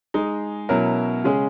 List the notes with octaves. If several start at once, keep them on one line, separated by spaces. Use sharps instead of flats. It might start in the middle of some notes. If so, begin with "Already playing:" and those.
G#3 D#4 G#4
B2 F#3 C#4 E4 A#4
C#3 G#3 C#4 G#4